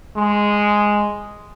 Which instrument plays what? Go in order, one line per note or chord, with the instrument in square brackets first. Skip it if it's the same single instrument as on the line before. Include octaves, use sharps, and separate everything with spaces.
[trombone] G#3